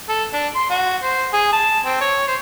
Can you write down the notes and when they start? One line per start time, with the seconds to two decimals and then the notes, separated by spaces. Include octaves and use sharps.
0.09 A4
0.33 D4
0.55 C6
0.70 F#4
1.03 C5
1.33 G#4
1.53 A5
1.85 C4
2.01 C#5
2.27 C5